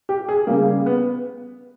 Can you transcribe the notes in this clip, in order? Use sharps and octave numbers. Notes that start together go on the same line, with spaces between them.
G4
G#4
C#3 G3 A#3
B3